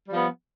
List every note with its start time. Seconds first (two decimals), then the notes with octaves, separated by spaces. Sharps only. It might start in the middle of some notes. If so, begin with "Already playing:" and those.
0.09 G3
0.12 F3
0.15 B3